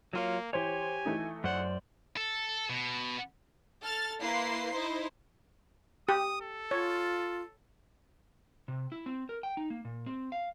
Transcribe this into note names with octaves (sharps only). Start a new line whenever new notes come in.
F#3 A#3 F4 C#5
E3 G4 C5 C#5 G#5
E3 A3 D#4
F#2 C5 D5 F#5
A4
B2
A4 F6 A6
A#3 E4 B4 C6 C7
D#4 E4 C5
G4 D#6
A4
F4 C#5
C3
E4
C4
A#4
G5
D#4
A#3
A#2
C4
F5